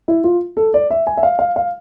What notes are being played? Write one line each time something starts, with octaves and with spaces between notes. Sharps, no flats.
E4
F4
A4
D5
E5
G#5
E5
F5
F5
F5